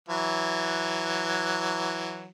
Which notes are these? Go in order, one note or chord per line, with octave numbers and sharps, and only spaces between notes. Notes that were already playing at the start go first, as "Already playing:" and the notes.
E3 F#3